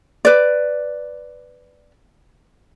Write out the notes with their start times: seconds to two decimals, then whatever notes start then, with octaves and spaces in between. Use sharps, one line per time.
0.25 B4 D5